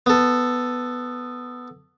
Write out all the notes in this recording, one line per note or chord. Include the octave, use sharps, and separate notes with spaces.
B3 A4